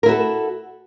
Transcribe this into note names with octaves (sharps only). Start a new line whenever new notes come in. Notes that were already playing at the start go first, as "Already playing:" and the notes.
E4 F#4 A4 A#4